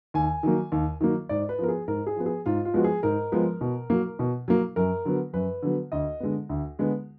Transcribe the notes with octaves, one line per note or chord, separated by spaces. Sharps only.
D#2 G#5
D#3 F#3 A#3
D#2
D#3 F#3 A#3
G#2 D5
B4
F3 B3 A#4
G#4
G#2 A#4
G#4
F3 B3
G#4
G#2 F4
F4
F3 G#3 B3 F#4
G#4
G#2 A#4
F3 G#3 B3
B2
F#3 A#3
B2
F#3 A#3
F#2 A#4
D3 F#3 B3
F#2 B4
D3 F#3 B3
D2 D#5
D3 G#3 B3
D2
D3 G#3 B3